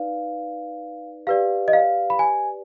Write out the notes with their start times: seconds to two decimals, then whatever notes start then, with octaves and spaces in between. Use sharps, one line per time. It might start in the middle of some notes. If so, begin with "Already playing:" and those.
Already playing: D#4 B4 D5 F5
1.27 G4 B4 D5 F5
1.68 D#5
1.73 F5
2.10 B5
2.19 G#5